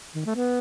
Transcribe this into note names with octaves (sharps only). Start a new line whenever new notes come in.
D#3
A3
B3